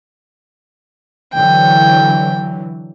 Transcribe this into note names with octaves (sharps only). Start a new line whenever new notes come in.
D3 E3 F#3 G5